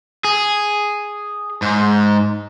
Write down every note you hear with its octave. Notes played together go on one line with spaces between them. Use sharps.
G#4
G#2